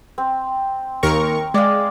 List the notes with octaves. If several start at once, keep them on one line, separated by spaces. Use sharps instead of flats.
C4
D#2 A#4 C#6
G#3 D5 F5